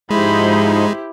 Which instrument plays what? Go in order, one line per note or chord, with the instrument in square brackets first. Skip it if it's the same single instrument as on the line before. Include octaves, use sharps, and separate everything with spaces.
[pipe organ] G#2 F3 D#4 [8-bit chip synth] G#3 [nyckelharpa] E4 G4 [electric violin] C5 B5